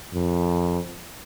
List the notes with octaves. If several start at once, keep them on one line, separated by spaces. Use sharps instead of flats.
F2